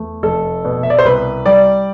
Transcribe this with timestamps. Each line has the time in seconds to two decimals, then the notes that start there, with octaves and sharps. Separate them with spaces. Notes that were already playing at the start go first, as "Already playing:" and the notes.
Already playing: E2 A3
0.23 F1 A4
0.65 B2
0.83 E5
0.90 D5
0.99 C5
1.05 C2 B4
1.46 G3 D5